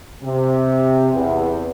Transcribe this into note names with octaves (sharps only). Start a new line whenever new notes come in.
C3
E2